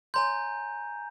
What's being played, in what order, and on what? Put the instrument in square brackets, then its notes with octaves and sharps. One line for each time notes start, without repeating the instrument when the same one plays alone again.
[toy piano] C#5 C6 [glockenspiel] G#5 A#5 G6